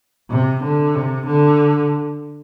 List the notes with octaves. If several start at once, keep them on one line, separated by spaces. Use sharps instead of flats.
C3
D3
C3
D3